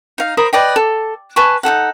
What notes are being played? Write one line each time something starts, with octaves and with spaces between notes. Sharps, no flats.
D#4 F5
A#4 C5 B5 D#6
B4 D5 D#5 G5
A4
B4 G#5 A5 C#6
D#4 F#4 A4 F#5